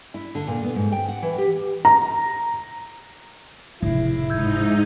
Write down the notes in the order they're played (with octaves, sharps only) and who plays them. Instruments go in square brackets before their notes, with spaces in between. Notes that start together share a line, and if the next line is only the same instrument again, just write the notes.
[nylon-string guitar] E4
D3
A#2
B3
G#2
G5
F#5
E3
G4
[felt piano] A#5
[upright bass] F1 [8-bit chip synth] A2 C#3 [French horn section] E4
[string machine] G#2 D#4 [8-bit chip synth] E6 G6 G#6